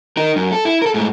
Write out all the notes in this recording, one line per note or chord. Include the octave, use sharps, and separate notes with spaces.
D#4 A#4
F#2
A4
E4
A4 A#4
G#2 A3